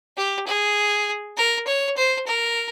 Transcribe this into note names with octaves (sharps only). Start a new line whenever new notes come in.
G4
G#4
A#4
C#5
C5
A#4